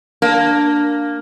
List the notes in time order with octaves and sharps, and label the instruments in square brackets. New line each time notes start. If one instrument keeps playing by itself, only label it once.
[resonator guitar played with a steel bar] A#3 [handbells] D4